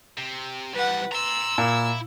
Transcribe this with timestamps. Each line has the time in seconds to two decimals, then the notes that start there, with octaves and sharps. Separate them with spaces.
0.18 C3
0.74 E2 G3 B4 F#5
1.12 A#5 C6 E6
1.58 A#2 E4